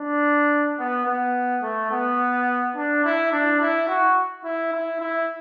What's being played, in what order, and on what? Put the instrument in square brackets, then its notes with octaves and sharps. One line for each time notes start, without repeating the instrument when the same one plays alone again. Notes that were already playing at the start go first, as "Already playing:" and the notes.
Already playing: [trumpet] D4
B3
B3
A3
B3
D4
E4
D4
E4
F#4
E4
E4
E4